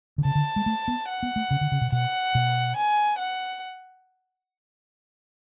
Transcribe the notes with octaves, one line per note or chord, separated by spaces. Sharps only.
D3
C#3 A5
D3
G#3
A3
B3
F#5
B3
A3
C#3
D3
C#3
B2
B2 F#5
B2
G#5
F#5